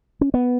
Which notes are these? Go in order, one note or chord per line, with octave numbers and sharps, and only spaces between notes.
C#4
B3